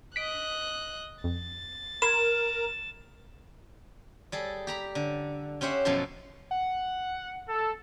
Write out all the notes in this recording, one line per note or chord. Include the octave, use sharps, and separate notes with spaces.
D#5 F#6 B6 D7
F2 A6
A#4 B5 C6 G#6 E7
G3 G#4 A4
G4 A#5 B5
D3
C#4 G4 C5 E5 F#5
F#2 B2 F3 E4 A4 C6
F#5
A4